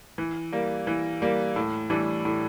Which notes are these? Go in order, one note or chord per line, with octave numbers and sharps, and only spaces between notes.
E3
G3 A#3
E3
G3 A#3
A2
E3 G3 D4
A2